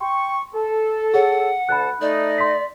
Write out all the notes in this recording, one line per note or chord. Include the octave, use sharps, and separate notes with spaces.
G5 C6 C#6
A4
G#4 C#5 F#5
D2 A5 B5 F#6
A3 D#4 D5
C6 B6